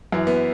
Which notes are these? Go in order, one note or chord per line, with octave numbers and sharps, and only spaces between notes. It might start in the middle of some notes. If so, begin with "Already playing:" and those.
F#2 E3
B3